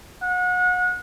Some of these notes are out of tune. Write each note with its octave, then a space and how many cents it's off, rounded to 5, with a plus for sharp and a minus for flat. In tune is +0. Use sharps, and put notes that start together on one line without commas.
F#5 -35